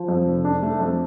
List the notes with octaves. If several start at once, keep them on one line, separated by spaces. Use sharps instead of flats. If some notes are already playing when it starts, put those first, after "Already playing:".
Already playing: F3
F2
F1
D4
A3
F2